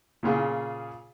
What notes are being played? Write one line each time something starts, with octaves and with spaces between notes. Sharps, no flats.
A#2 C#3 F4 G#4